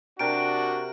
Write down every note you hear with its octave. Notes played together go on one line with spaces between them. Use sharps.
C3 D4 F#4 A#4 G5 D7